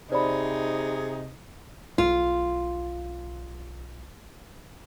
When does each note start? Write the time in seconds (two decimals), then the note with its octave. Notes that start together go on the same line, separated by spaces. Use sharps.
0.12 C3 D#4 G#4 C5 D5 B5
1.98 B1 F4